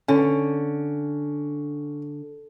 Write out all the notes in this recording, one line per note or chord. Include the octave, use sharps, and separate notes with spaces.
D3 C#4